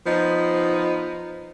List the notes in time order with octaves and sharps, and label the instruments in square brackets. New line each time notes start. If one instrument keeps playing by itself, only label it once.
[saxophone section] F3 B3 D#4